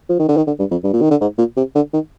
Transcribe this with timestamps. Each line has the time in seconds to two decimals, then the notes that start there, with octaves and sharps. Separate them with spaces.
0.09 F3
0.19 D#3
0.29 D3
0.37 D#3
0.47 D3
0.59 G2
0.71 F2
0.84 G2
0.93 A#2
1.01 D#3
1.11 D3
1.21 G#2
1.38 A#2
1.57 C3
1.75 D3
1.93 D#3